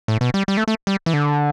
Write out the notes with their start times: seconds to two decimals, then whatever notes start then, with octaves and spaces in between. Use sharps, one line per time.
0.08 A2
0.21 B2
0.34 G3
0.48 G3
0.57 A3
0.68 A3
0.87 G3
1.06 E3
1.13 D3